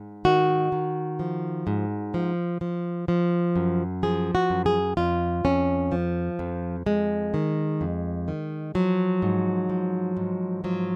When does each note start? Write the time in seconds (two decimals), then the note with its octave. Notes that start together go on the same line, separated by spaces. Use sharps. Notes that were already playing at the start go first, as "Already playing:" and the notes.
Already playing: G#2
0.25 D#3 F#4
0.72 D#3
1.20 F3
1.67 G#2
2.14 F3
2.61 F3
3.08 F3
3.56 F#2
4.03 F3 G#4
4.35 F#4
4.50 F#2
4.66 G#4
4.97 F2 F4
5.45 F2 C#4
5.92 F3
6.39 F2
6.86 F2 G#3
7.34 D#3
7.81 F2
8.28 D#3
8.75 F3 F#3
9.22 G#2
9.69 F3
10.17 G#2
10.64 F3 F#3